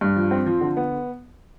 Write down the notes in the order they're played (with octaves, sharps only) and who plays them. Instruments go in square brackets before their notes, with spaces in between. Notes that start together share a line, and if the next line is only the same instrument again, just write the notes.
[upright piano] G2
F3
C4
F3
D3
B3